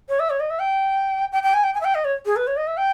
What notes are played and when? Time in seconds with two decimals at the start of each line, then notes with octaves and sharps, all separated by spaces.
0.09 C#5
0.20 E5
0.30 C#5
0.40 D#5
0.50 E5
0.60 G5
1.32 G5
1.43 G5
1.54 G#5
1.63 G5
1.74 G#5
1.81 E5
1.85 G5
1.95 D#5
2.05 C#5
2.25 G#4
2.36 B4
2.47 C#5
2.57 D#5
2.67 E5
2.77 G5